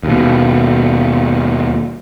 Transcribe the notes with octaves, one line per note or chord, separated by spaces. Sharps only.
D#2 B2